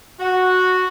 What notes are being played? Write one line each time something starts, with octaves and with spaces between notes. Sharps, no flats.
F#4